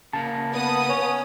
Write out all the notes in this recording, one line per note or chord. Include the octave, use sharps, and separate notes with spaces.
C#3 A#3 A5
B3 D#6
C#4 C#5